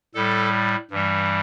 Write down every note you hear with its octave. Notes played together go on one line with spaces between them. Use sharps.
A2 G3 A4
G2 E3 G3